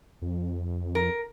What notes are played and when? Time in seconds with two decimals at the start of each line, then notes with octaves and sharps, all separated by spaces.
0.22 F2
0.95 A#4